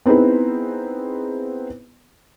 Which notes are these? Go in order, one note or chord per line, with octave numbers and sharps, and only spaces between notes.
B3 C4 D#4 E4 G#4 B4